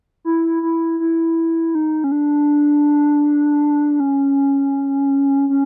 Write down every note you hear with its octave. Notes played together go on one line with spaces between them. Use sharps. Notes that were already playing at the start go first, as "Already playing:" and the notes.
E4
E4
E4
D#4
C#4
D4
C#4
C#4